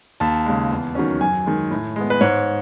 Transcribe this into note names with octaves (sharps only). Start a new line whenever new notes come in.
D#2 A5
C#3 G#3
E2
D#3 F#3 C#4
F#2 G#5
D#3 G#3
A2
G#3 B3
B4
G#2 C#5